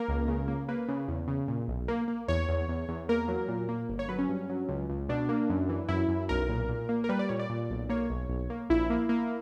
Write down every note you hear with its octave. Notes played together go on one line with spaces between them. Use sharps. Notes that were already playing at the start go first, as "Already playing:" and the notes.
Already playing: A#3 A#4
C#2
C#3
A#3
A#3 B4
C#3
E2
C#3
A#2
B1
A#3
A#3
E2 C#5
E2
E2
E2
A#3 A#4
F#3
A#2
A#3
G1
C#5
F#3 B4
C#4
G2
F#3
C#2
C#2
B2 D4
A#3
F#2
E3
F#2 E4
F#2
B1 A#4
A#2
A#2
A#3
A#4
G3 B4
D5
A#2 C#5
D5
A#2
B1
A#3 C#5
B1
B1
A#3
A#1 E4
A#3
A#3